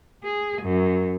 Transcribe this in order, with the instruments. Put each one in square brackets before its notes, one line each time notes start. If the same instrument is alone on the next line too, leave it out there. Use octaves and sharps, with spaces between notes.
[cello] G#4
F#2